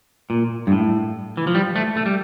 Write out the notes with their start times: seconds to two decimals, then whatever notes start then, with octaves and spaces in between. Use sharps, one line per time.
0.30 A#2
0.67 G2
0.72 A2
1.37 E3
1.47 F3
1.55 G3
1.76 A3
1.97 A3
2.06 G3